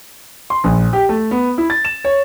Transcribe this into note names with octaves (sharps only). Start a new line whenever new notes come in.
C6
A#1
G4
A3
B3
E4
A6
E7
C#5